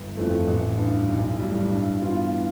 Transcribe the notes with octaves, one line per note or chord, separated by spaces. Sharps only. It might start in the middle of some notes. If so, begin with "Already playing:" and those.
Already playing: G1
F2 E3 A3
A1
G2 E3
B1
A2 G3
G2
E3 B3 F4